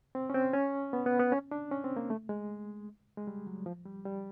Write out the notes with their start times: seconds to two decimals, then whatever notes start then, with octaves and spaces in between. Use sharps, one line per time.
0.15 C4
0.30 C#4
0.35 C4
0.54 C#4
0.93 B3
1.06 B3
1.19 B3
1.32 C#4
1.51 D4
1.71 C#4
1.84 C4
1.97 A#3
2.10 A3
2.29 G#3
3.17 G#3
3.27 G3
3.47 F#3
3.66 F3
3.86 G3
4.05 G3